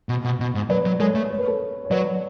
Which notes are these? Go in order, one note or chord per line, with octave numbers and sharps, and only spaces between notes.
B2
B2
B2
G#2
F#3 B4 D5
F#3
G#3 A4 C#5
A3
C#5
B4
A4 C#5
C#5
F#3 B4 D5